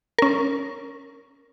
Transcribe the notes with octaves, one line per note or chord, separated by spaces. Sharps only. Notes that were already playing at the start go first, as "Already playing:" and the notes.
C#4 A#4